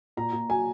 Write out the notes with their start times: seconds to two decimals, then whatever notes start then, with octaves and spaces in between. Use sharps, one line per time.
0.17 A#2 A#5
0.33 A#2
0.49 F#3 G#5